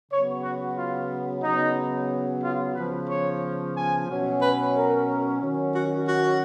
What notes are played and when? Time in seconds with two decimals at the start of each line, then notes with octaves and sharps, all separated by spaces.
0.10 C#3 F#3 B3 C#5
0.44 F#4
0.77 F4
1.44 C#3 F#3 B3 D#4
2.44 F4
2.76 C#3 F3 B3 B4
3.09 C#5
3.76 G#5
4.08 B2 F#3 C#4
4.41 B4
4.75 A#4
5.41 D#3 F#3 C#4
5.75 F#4
6.08 F#4